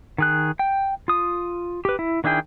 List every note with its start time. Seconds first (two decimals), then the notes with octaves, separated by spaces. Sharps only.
0.18 D#3 G#4 F#6
0.59 G5
1.08 F4 D#6
1.85 G4 B4
1.99 E4
2.24 D#3 D4 E4 G#4 G5